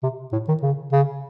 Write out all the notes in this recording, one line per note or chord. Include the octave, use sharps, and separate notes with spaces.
C3
A2
D#3
C#3
C#3